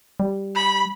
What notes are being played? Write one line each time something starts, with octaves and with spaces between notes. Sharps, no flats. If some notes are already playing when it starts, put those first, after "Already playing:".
G3
B5